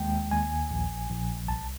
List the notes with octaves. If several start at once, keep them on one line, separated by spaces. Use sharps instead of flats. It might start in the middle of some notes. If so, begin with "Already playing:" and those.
Already playing: D#2 G#3 G5
D#2 G#5
A#1
A#1
C2 A5